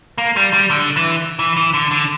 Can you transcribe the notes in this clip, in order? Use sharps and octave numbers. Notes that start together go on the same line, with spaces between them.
A#3
G3
G3
D3
E3
E3
E3
D3
D3